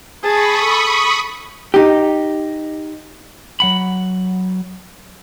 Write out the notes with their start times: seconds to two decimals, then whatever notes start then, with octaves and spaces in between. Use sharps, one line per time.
0.23 G#4 A5 B5 C#6 D#6
0.63 A4
1.74 D#4 G4
3.60 F#3 F#5 B5